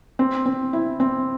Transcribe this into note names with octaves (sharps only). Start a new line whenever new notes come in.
C4
C4
E4
C4